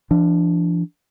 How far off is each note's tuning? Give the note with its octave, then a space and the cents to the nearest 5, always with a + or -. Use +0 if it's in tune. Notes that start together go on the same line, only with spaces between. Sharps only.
F3 -45 D4 +0